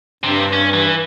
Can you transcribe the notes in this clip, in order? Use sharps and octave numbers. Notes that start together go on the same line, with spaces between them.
G2 C3
C#4
E3